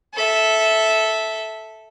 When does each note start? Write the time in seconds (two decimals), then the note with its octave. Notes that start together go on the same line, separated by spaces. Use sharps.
0.14 A4 E5